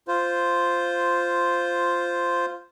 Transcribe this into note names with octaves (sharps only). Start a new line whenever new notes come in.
F4 C5